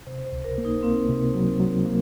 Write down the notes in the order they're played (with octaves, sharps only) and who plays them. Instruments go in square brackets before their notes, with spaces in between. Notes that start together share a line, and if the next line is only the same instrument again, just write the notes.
[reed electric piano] C3 [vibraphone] C5
[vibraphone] C5
[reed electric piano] C#2
[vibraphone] A#4
[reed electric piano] A#3
[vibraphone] D#4
[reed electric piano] A#3 [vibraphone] C4
[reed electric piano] C3
F#3
F#3
A#3